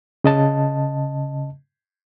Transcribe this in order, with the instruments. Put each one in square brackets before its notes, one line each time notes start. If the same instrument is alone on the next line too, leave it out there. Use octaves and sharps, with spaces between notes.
[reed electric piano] C#3 D#5 A5